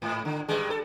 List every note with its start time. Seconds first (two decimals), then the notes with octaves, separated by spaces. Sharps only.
0.02 G#2
0.25 D3
0.48 G2 G3 G#3
0.70 A4